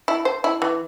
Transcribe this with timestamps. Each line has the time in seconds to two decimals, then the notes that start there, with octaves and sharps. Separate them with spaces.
0.08 E4
0.25 C5
0.44 E4
0.62 E3